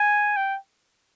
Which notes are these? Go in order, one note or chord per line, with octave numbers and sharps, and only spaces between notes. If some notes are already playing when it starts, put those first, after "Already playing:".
Already playing: G#5
G5